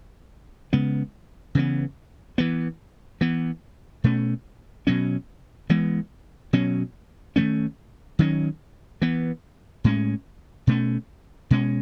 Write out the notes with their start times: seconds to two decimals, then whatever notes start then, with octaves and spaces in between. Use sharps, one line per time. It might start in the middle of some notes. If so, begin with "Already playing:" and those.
0.73 C#3 G#3 B3
1.55 C#3 E3 B3
2.38 E3 B3
3.21 E3 B3
4.04 B2 A3 C#4
4.87 B2 F#3 C#4
5.69 E3 G#3 B3
6.53 B2 F#3 C#4
7.36 D#3 F#3 A3 C#4
8.19 D#3 F#3 C#4
9.02 E3 B3
9.84 A2 G#3 C#4
10.67 B2 A3 C#4
11.51 B2 G#3 C#4